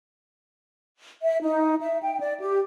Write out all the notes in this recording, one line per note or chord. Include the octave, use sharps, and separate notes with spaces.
E5
D#4
E5
G5
D5
G4